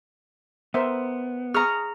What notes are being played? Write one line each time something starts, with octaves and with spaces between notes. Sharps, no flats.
B3 A#4 C5 E5
G#4 A#5 C#6 D#6 F6